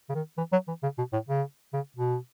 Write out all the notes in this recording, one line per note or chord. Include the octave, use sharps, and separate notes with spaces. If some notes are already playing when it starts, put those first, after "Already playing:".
C#3
D#3
E3
F#3
E3
C#3
B2
A2
C#3
C#3
B2